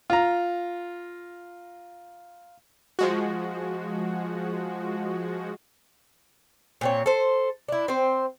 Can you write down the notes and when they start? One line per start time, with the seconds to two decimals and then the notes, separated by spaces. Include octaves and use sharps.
0.10 F4 A#5
2.99 F3 G#3 F#4
6.81 A#2 C4 C#5
7.06 A4 C5
7.68 D4 E4
7.88 C4 C5